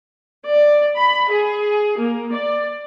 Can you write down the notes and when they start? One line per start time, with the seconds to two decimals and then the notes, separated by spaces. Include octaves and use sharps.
0.44 D5
0.97 B5
1.31 G#4
1.99 A#3
2.31 D5